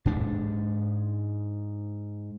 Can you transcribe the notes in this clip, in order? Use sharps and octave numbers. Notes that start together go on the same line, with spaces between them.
G#2 D4